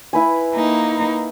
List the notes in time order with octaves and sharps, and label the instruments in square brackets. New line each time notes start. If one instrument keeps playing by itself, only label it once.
[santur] E4 B4 G#5
[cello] A#3 D#4